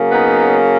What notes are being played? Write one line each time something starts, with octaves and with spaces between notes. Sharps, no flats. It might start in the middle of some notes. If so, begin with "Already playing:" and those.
Already playing: C#3 F#3 A#3
B3 D#4